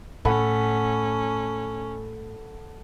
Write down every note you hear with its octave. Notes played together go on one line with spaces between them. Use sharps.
A2 C#4 A4 F#5 B5